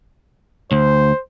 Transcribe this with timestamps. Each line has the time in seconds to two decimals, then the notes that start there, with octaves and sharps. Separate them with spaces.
0.72 D2 C5